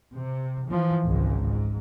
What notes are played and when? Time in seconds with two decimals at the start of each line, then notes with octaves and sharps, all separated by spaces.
0.15 C3
0.68 E3 F3
1.05 G#1 C#2 G#2
1.46 G#2